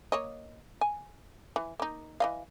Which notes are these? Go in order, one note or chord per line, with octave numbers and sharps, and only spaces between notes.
A#3 C#5 D#5
G#5
E3
A#3 D#4
E3 D#5 F5